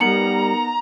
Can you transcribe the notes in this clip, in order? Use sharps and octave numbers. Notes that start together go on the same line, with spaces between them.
G3 B3 D#4 A#4 A#5 C#7 F#7